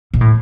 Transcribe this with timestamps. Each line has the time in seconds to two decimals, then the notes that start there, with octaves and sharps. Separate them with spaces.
0.14 B2
0.21 A2